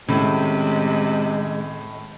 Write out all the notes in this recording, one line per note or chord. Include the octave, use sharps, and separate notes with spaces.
A2 C3 D#3 G#3 C#4